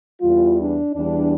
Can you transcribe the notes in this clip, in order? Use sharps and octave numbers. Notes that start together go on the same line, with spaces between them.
E2 E3 G3 F4
D4
E2 E3 G3 D4